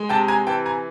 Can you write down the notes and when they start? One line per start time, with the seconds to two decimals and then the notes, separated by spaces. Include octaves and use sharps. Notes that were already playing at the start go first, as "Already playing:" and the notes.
Already playing: G#3
0.09 C3 G5 A5
0.28 G#5 A#5
0.47 E3 G5 A5
0.65 G#5 A#5